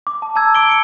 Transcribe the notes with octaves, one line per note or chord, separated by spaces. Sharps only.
D6
A5
A5 A#5 E6 G#6
D6 D7 G7
C#7 D7